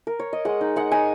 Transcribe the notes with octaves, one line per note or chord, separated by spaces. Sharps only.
A#4
C#5
D#5
G#3 F#5
D#4
G#3 F#5
D#4 G#5